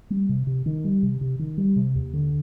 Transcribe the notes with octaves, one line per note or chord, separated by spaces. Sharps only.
G3
C3
C3
D#3
G3
C3
C3
D#3
G3
C3
D#2
D3